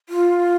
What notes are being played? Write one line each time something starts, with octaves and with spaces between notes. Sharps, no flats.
F4